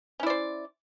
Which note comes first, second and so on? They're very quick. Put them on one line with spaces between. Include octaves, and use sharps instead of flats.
C#4 E4 D5 C5